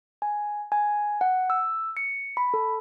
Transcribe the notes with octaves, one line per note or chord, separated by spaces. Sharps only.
G#5
G#5
F#5
E6
C#7
B5
A4